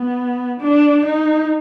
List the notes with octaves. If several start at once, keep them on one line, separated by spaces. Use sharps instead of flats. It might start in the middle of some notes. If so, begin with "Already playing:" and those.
Already playing: B3
D4
D#4